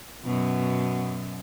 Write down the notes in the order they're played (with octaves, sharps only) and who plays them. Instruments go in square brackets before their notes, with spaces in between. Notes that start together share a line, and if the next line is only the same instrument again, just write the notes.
[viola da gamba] F#2 B2 B3